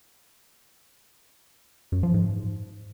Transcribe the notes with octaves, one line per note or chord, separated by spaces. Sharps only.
F#2
F3
G#2